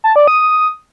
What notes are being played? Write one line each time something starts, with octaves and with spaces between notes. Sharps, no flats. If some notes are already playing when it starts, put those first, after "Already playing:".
A5
D5
D#6